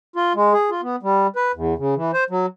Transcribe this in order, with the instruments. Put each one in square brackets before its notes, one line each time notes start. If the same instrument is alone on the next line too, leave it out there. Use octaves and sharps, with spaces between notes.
[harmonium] F4
G#3
G#4
F4
B3
G3
B4
E2
C#3
E3
C5
F#3